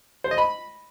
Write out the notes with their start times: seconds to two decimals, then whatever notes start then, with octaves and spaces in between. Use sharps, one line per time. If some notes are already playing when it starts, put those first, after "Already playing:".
0.24 C5
0.31 D#5
0.38 B5